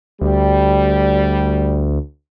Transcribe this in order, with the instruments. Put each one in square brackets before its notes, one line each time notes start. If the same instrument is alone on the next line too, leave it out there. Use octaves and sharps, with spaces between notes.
[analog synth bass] D2 [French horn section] G3